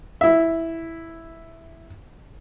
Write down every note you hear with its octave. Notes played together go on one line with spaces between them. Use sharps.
E4 E5